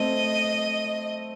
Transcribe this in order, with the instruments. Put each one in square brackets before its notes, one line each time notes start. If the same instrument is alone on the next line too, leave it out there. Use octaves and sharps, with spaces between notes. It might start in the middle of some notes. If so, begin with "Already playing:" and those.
Already playing: [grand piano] A3 C4 [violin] D#5